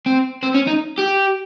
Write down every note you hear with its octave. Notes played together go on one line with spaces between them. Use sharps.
C4
C4
C#4
D#4
G4